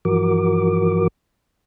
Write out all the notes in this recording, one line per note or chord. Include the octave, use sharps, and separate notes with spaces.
G2 E3 F3 F#4 A#4 D6